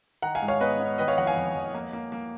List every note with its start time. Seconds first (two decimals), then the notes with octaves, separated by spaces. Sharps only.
0.22 D#3 F#5 A#5
0.35 F5 G#5
0.42 G#2
0.48 C#5 F5
0.60 B3 B4 D#5
0.79 B3
0.98 D#3 B4 D#5
1.08 C#5 F5
1.18 F2 D#5 F#5
1.27 F5 G#5
1.37 F2
1.55 F2
1.74 A#3
1.93 A#3
2.12 A#3